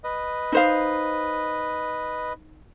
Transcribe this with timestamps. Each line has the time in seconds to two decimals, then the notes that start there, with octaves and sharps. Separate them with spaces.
0.04 B4 D#5
0.52 D#4 C5 F5